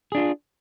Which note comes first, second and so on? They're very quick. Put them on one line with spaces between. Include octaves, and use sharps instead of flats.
G#4 D4 F4